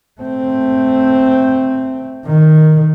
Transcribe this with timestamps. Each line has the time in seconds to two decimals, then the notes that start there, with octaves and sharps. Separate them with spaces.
0.21 A3 C4
2.26 D#3